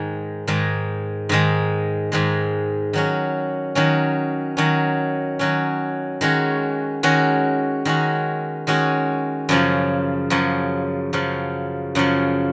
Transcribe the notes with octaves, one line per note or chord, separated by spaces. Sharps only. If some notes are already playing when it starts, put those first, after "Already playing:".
Already playing: G#2 D#3 G#3
G#2 D#3 G#3
G#2 D#3 G#3
G#2 D#3 G#3
D#3 F#3 C#4
D#3 F#3 C#4
D#3 F#3 C#4
D#3 F#3 C#4
D#3 G#3 C#4 F#4
D#3 G#3 C#4 F#4
D#3 G#3 C#4 F#4
D#3 G#3 C#4 F#4
F#2 C#3 F3
F#2 C#3 F3
F#2 C#3 F3
F#2 C#3 F3